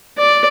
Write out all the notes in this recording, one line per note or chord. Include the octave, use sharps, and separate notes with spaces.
D5